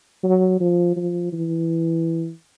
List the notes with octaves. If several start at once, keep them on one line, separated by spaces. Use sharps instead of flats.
F#3
F3
F3
E3